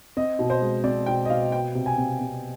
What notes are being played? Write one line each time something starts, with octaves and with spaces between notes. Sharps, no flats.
C4 D#5
B2
C5
G#3
C4 D5
B2 G5
D#5
B2 F5
B3 G5
C3
G#5
C3
C3